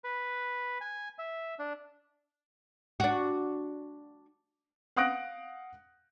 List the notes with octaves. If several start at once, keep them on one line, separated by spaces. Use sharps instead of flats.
B4
G#5
E5
D4
D4 F#4
F5 F#5 D#6 F#6 A#6 D7